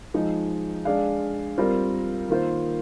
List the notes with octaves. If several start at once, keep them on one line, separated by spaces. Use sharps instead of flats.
F3 G#3 D#4
G#3 D4 G#4 D5 F5
G3 C4 F4 A#4
D#3 A#3 F4 C5